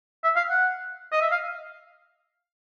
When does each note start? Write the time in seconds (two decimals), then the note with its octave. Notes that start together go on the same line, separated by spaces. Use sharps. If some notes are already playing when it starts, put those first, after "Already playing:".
0.24 E5
0.36 F5
0.50 F#5
1.12 D#5
1.21 E5
1.32 F5